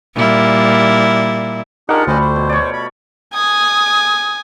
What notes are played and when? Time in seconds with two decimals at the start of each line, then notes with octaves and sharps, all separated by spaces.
0.15 A#2 G3 E4
1.89 D4 D#4 F4 G4 G#4 A#4 F#5
2.07 D2 G3 A3 C#4 C5 D#5
2.21 C5
2.36 B2
2.49 C#5 D5
2.73 B5
3.34 G#5 D#6